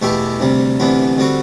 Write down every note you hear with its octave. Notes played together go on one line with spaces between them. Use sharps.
E2 B2 A3 E4 G4
D2 C3 G3
D2 C3 E3 B3 D4
D3 G3 C4 F#4